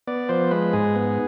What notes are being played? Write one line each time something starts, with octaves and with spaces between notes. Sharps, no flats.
B3 D5
F3 C5
G#3 B4
G#2 G#4
B3